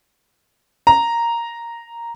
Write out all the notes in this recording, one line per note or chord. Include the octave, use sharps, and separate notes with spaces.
A#5